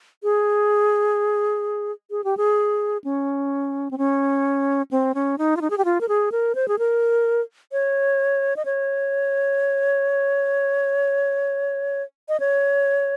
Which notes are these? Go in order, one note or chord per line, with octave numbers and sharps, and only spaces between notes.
G#4
G#4
G4
G#4
C#4
C4
C#4
C4
C#4
D#4
F4
D#4
G#4
G4
F4
A#4
G#4
A#4
C5
G#4
A#4
C#5
D#5
C#5
D#5
C#5